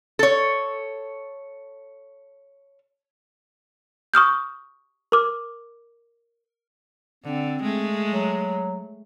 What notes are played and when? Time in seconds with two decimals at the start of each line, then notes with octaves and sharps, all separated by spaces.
0.19 A4 C#5
4.14 C#6 D#6 F6 G6
5.12 A#4 D6 F6
7.24 D3 C4
7.62 G#3 A3
8.12 F#3